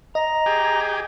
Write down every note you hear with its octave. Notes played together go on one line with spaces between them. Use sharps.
D#5 A#5 A#6
G4 G#4